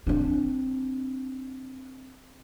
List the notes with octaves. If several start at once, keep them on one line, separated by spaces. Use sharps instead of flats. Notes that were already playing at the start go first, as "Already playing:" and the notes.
C4 D4